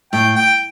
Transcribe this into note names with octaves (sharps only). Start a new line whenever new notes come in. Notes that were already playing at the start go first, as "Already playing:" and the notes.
A2 G5
G5